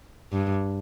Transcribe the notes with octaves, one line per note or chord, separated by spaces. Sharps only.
G2